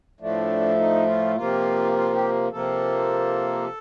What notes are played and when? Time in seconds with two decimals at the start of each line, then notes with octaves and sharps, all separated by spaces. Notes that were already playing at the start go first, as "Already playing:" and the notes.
0.21 A2 F3 A3 D4
0.78 D#4
1.07 F4
1.36 C3 F3 A#3 F4
1.94 F4
2.13 G4
2.52 C3 F3 A#3 A4